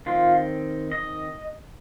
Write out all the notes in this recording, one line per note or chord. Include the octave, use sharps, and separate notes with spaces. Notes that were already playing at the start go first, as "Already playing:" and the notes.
D#3 C4 F4
D#5